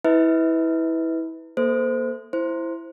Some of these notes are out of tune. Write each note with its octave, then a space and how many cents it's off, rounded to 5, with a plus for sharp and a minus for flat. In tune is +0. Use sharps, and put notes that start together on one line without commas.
E4 -20 B4 +10 E5 -40
A#3 +20 A4 +0 C5 -25
E4 +10 C5 +0